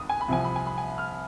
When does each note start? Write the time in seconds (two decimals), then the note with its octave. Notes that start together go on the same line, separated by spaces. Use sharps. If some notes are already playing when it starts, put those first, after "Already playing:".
Already playing: G#1 G2 D#6
0.09 G#5
0.21 B5
0.28 C2 C3 F3 G#5
0.44 B5
0.56 G#5
0.66 B5
0.78 G#5
0.98 F6